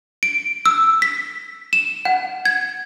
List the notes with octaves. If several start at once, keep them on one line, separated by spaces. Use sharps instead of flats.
D7
E6
B6
E7
F#5
G#6